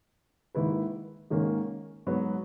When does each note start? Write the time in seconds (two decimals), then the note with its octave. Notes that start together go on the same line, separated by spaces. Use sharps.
0.55 G#2 D#3 A#3 E4 B4
1.30 G#2 D#3 A#3 C#4
2.07 G#2 F#3 B3